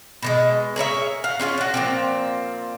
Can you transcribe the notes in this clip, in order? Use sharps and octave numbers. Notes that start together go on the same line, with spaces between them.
B2 D#3 G#3
G#4 A#4 C#5 E5
F5 F#5
C#4 F4 G#4 F5
D4 F#4
A#2 F3 C4